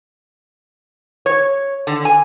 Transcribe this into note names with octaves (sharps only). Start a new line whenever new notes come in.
C#5
D3
G#5